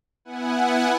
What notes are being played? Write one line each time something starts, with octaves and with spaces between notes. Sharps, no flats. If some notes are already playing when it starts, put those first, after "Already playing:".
B3 E4 F#5 G#5